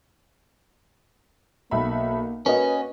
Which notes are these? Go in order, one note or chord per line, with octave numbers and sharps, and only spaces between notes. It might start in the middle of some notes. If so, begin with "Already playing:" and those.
B1 A#3 E5 B5
A#3 C#4 F#4 B4 D#5